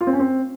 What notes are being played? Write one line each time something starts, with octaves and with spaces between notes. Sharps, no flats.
F4
C4
C#4
C4